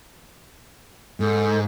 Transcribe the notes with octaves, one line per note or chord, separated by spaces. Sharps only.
G#2 A4